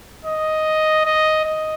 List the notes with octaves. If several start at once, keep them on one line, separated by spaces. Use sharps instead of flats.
D#5
D#5
D#5